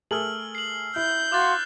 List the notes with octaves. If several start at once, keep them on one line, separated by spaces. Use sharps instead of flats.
A3 G#4 A#4 E6 F6 F#7
C7 F#7
E4 G6
F#4 F5 C6 D6 F#6 A6